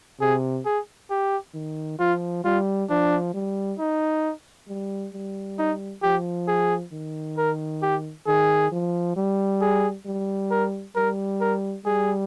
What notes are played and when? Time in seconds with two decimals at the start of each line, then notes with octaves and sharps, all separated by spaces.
0.20 C3 G#4
0.65 G#4
1.10 G4
1.54 D#3
1.99 F3 F4
2.44 G3 F4
2.90 F3 D4
3.34 G3
3.79 D#4
4.68 G3
5.13 G3
5.58 D#4
6.03 F3 G4
6.47 G#4
6.92 D#3
7.37 A#4
7.82 G4
8.27 D#3 G#4
8.72 F3
9.16 G3
9.61 G#4
10.06 G3
10.51 A#4
10.96 G3 A#4
11.40 A#4
11.85 G3 G#4